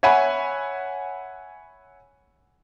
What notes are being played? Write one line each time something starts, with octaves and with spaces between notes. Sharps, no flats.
C#5 E5 F#5 G#5 B5